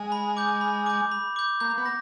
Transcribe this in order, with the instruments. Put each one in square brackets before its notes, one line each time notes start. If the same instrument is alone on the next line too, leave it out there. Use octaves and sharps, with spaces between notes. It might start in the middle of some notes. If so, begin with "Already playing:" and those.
Already playing: [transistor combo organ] G#3
[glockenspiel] B5
D6 G6
B5
D6 G6
B5
D6 G6
[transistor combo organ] A#3 [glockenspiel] G6
[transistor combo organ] B3
[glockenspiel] A#6